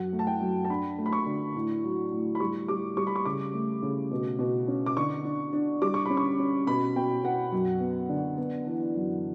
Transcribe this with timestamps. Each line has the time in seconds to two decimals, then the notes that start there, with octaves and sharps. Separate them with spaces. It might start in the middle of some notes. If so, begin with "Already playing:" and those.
Already playing: F#2 F#5
0.13 A3
0.19 A5
0.27 G5
0.41 F#2
0.65 A5
0.70 D4 B5
0.98 A3
1.06 B5
1.13 C#6
1.26 D3
1.55 A2
1.84 F#3
2.12 A2
2.35 B5
2.40 G3 C#6
2.68 G3 D6
2.97 G3 C#6
3.07 B5
3.16 C#6
3.25 C#3 D6
3.54 A3
3.82 C#3
4.11 B2
4.39 B2
4.68 C#4
4.86 D6
4.97 D3 C#6
5.25 D4
5.53 D4
5.82 G3 D6
5.94 C#6
6.06 C#4 B5
6.17 C#6
6.39 C#4
6.67 B2 B5
6.96 B2 G5
7.23 B2 F#5
7.52 F#2
7.80 B3
8.09 D3
8.37 B3
8.66 E3
8.94 F#2